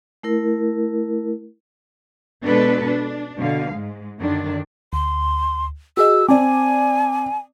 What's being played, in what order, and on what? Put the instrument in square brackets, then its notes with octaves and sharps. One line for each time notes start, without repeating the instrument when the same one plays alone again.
[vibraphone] A3 E4 A#4
[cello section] B2 G#3 B3 D4 A4 B4
D4
B2 D3 F5
G#2 G#3
F#2 D3 D#3 D4
[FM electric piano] D2 [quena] C6
[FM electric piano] F#4 G#4 D#5 [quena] E6
[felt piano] C4 [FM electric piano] D5 A5 D6 [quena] G#5